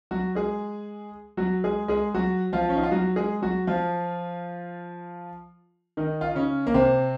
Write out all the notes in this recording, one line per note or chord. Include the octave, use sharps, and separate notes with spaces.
F#3 F#4
G#3 G#4
F#3 F#4
G#3 G#4
G#3 G#4
F#3 F#4
F3 F4
C#4
D#4
F4
F#3 F#4
G#3 G#4
F#3 F#4
F3 F4
D#3 D#4
F4
D#4
C#3 C#4
A#3
C3 C4